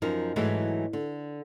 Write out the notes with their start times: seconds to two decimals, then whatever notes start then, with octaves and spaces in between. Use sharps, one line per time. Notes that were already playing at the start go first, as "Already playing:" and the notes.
0.02 F#2 F3 D#4 A#4
0.36 G#2 E3 F#3 G#3 A3
0.93 D3